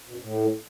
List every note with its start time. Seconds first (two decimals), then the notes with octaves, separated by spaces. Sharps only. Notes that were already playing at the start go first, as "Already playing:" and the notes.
0.09 B2
0.14 F#2
0.19 A2